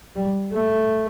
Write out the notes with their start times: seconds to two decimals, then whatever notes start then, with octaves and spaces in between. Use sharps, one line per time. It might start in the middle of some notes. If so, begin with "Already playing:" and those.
0.16 G3
0.53 A3